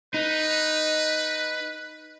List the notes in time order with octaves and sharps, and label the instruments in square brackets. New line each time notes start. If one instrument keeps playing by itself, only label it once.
[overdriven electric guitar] D#4 [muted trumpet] B4